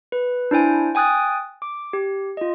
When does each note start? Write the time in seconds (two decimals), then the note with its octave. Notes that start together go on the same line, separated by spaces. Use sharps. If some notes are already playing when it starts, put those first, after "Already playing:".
0.12 B4
0.51 D4 E4 C5 G#5
0.95 G5 G#5 D#6 F#6 A6
1.62 D6
1.93 G4
2.37 F4 D#5